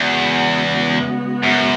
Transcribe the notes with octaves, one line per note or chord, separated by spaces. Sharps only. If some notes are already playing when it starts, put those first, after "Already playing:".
Already playing: E2 C#3 G#3 B3 F#4
F#2